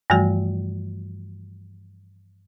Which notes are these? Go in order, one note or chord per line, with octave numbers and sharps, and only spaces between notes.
G2 E3 F3 G3 A3 F#4